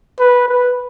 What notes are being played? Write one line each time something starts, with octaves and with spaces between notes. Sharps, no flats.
B4
B4